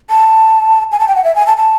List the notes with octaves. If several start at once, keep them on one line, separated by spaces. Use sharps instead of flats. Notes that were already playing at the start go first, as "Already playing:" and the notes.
A5
G#5
A5
G5
F#5
E5
G#5
A5
A5